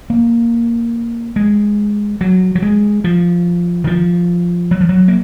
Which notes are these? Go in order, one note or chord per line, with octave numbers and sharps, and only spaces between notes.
A#3
G#3
F#3
F#3
G#3
F3
D#3
F3
F#3
F3
F#3
A#3